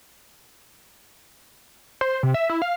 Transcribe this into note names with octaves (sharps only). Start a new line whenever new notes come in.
C5
C3
E5
E4
F5